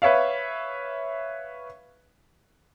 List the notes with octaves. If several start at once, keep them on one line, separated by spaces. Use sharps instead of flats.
B4 C#5 E5 F5